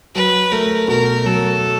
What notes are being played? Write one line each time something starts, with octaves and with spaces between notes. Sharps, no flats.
F#3 B4
A3 A#4
B2 A#4
F#3 A4